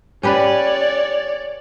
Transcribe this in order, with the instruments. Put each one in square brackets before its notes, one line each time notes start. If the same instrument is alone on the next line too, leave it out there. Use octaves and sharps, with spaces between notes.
[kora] C#4 G4 B4 [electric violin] C#5 D5